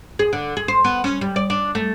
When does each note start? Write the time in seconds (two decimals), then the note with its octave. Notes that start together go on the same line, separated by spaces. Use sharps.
0.19 G#4
0.33 D3
0.57 G#4
0.68 C5
0.84 B3
1.04 C#4
1.21 G3
1.36 D5
1.50 D4
1.75 A3